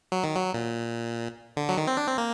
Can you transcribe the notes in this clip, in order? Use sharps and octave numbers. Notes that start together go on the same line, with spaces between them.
F#3
D#3
F#3
A#2
D3
F#3
D#3
C4
D4
C4
A#3